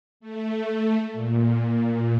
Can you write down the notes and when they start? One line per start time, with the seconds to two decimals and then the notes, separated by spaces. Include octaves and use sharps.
0.20 A3
1.13 A#2